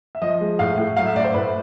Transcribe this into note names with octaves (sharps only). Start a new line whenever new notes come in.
E5
F3 D#5
G#3
A2 F5
A2
F#3 F5
E5
A2 D5
C5
A2 B4